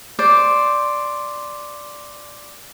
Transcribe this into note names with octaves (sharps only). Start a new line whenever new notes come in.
C5 D5